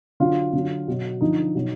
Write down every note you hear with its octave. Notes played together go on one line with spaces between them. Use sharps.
D3 F#3 F4
D3 F#3
B2 F#3
D3 F3 D#4
B2 F#3